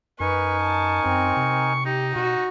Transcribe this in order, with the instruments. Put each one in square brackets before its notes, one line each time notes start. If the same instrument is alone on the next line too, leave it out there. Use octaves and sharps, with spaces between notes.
[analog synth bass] F#2 [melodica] D#4 A#4 G#5 [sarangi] B4 [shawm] C#6
[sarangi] A5
[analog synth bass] F#2 [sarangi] C4
[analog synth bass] C3
[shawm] D#4 [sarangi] G4
[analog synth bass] B2 [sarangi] F#4